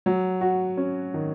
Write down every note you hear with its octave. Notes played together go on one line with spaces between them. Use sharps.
F#3
F#4
C#4
D#3